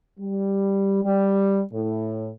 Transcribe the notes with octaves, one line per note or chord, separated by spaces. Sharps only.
G3
G3
A2